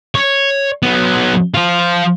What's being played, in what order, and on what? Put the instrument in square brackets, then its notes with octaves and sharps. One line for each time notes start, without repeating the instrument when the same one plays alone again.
[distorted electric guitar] C#5
F#3 B3
F3 F4